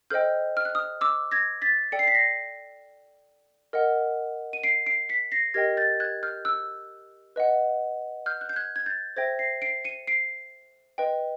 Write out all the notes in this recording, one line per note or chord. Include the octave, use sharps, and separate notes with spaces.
A4 C5 D#5 G5 F6 G6
F6
F#6
D#6 F6
D6 E6
G#6 A#6
A6 B6
A4 D5 G5 C#7
C7
B6
A#6 C7
A#4 D#5 F#5
D#7
C7 D7
C7 D7
B6 C#7
A#6 C7
G4 A#4 D#5 G5 G#6 A#6
G6 A6
F#6 G#6
F6 G6
E6 F#6
B4 D#5 F#5
F6 G6
F#6
G6
F#6 G#6
G#6
G6 A6
A4 C5 E5 G5 G#6 A#6
A#6 C7
C7 D7
C#7 D#7
C7 D7
B4 D#5 G5